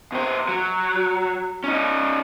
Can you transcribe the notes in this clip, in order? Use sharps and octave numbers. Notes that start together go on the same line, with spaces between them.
B2 C5
F#3
C#4 D#4